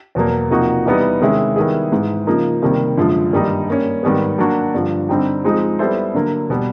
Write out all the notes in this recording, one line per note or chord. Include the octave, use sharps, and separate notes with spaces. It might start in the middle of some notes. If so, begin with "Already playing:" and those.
E2 B2 F#3 A#3
C3 F3 A#3 D#4 F#4
E3 G3 B3 D#4
C3 D#3 G#3 C#4 E4
D#3 G3 B3 E4 G#4
G#2 E3 G#3
C#3 F3 A#3 D#4
C3 D#3 G3 A#3
F#2 D3 F3 G#3
G2 D#3 G3 A#3 D#4
G3 A#3 C#4
G#2 D#3 G3 B3
F#3 A#3 D4 F#4
G2 D3 F3
D3 G3 C4 D#4 G4
F3 G#3 C4 D#4
G3 B3 E4 A4 C5
D3 F#3 A#3
B2 G3 B3